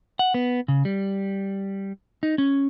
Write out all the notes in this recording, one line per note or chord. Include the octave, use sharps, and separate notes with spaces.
F#5
B3
C#3
G3
D#4
C#4